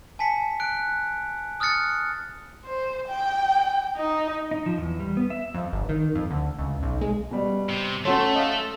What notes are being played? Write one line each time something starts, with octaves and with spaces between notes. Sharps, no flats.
G#5 A5 B6 C#7
F#6 D7
D#6 F6 F#6 A6 C#7
C5
G5
D#4
D#4
F3
E2
G3
B3
E5
F2
G1
D#3
F2
D2
C#2
B1
G#3
B2 G3
C3
A3 C#4 F#4 A4 C#5 C6
D#5 F5